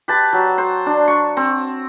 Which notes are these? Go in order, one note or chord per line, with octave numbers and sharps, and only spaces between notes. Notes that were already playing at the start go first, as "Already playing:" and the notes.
G4 B4 A5
F#3
C5
D4
C#6
C4